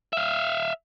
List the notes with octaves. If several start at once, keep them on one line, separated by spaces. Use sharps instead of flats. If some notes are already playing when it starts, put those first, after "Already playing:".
E5 F5